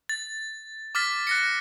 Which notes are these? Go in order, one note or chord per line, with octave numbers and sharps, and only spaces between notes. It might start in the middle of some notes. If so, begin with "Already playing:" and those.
A6
D6 F6 A6 B6
F#6 A#6 C#7